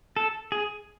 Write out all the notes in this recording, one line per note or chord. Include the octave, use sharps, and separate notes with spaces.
A4
G#4